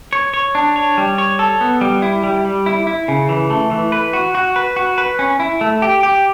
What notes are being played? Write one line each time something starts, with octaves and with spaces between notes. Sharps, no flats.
C#5
C#5
D4
C#5
G3
C#5
A4
B3
G3
E4
G3
G3
E4
E4
C#3
E3
A3
E3
B4
F#4
F#4
B4
F#4
B4
C#4
E4
A3
G4
G4